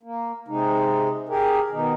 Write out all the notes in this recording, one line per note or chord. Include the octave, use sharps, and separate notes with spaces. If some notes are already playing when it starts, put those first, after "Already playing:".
A#3
C3 G#3 D#4
G4 G#4 A#4
B2 D#3 D#4